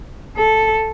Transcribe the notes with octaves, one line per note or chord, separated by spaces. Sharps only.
A4